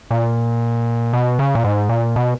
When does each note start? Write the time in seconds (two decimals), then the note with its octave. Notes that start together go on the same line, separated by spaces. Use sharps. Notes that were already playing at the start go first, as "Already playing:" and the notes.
0.11 A#2
1.13 B2
1.39 C#3
1.55 A#2
1.64 G#2
1.89 A#2
2.16 B2